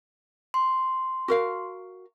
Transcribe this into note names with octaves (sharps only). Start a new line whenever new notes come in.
C6
F#4 A#4 F5